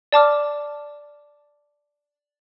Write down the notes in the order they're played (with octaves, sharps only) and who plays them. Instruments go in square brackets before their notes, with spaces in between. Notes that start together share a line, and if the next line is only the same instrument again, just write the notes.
[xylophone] D5 A5 D6 F6